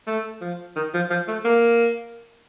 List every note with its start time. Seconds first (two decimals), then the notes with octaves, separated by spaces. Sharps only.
0.07 A3
0.41 F3
0.76 D#3
0.94 F3
1.10 F3
1.28 A3
1.45 A#3